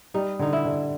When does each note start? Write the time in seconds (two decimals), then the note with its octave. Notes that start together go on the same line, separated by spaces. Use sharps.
0.14 G3 D#4
0.39 D3 D#4
0.53 E4
0.65 D3